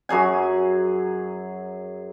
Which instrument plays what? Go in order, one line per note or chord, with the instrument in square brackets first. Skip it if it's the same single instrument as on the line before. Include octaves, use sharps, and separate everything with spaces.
[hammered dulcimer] F#2 F#3 G#4 G#5